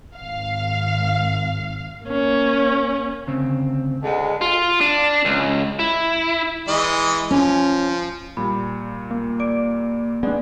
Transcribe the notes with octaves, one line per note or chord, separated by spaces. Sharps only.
G#1 F5
A#3 C#4
D2 C#3 C4
D2 G#3
F4
D4
C#2
E4
E3 G#3 D#5
F3 C#4
A#2 G3 B5
A#3
D5 D6 D7
G#3 B3 C4 D4 D5